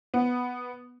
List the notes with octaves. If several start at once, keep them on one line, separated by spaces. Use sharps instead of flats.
B3